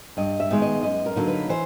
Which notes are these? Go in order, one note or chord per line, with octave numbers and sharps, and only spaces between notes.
G2 D#5
E5
D#3 G#3 B3 D#4
D#5
F#2 D#5
A#4
D3 F#3 A#3 D#4
B4
E3 C5